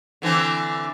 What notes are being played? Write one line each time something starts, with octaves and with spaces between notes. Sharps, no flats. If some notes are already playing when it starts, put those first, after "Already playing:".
D3 E3 C4